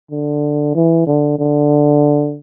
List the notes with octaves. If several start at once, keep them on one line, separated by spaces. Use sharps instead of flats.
D3
E3
D3
D3